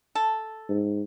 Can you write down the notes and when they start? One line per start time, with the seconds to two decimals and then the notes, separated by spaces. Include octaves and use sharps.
0.15 A4
0.69 G#2